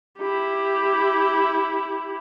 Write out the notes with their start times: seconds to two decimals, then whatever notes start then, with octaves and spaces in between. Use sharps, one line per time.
0.18 E4 G4